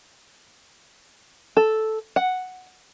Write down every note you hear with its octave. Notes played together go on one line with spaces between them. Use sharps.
A4
F#5